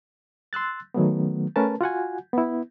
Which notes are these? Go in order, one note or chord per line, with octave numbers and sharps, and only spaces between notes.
C6 E6 F#6 A6
D#3 F#3 A3 B3
A3 C#4 A#4 B4 A5
F4 F#4 F#5 G#5
B3 E4